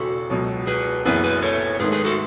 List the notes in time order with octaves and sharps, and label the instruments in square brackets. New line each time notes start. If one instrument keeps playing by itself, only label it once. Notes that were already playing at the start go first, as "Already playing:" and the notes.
Already playing: [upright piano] E1 E2 C#3 [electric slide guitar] F#4 A4
[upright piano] C#2 B2 F#3
[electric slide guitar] G#4 B4
[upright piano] F#1 F#2 E3 B3 [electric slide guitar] G#4 B4
[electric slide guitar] G#4 B4
A4 C#5
[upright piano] G#2 D#3 A3 [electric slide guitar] G#4 B4
[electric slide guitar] G#4 B4
F#4 A4